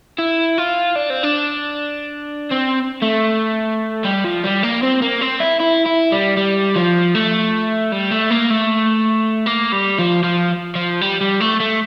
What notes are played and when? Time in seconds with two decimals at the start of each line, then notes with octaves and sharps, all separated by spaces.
0.18 E4
0.58 F4
0.96 D4
1.10 C4
1.23 D4
2.51 C4
3.02 A3
4.05 G3
4.25 F3
4.44 G3
4.63 A#3
4.83 C4
5.02 A#3
5.21 C4
5.40 E4
5.60 E4
5.86 E4
6.12 G3
6.37 G3
6.76 F3
7.15 A3
7.92 G3
8.11 A3
8.30 A#3
8.50 A3
9.46 A#3
9.73 G3
9.99 F3
10.23 F3
10.75 F3
11.01 G3
11.21 G3
11.40 A3
11.60 A3